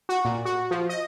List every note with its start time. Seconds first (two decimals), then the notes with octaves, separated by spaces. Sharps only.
0.09 F#4
0.25 A#2
0.45 F#4
0.71 F3
0.89 D#5